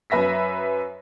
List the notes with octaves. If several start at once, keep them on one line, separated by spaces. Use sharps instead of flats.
F#2 B4 E5 A#6 B6